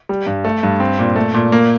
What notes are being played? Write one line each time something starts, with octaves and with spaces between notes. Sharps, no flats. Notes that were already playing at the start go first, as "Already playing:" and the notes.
G3
G2
A3
G2
C4
A#2
A3
A#2
A#3